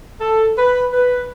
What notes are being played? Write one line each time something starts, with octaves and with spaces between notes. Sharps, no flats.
A4
B4
B4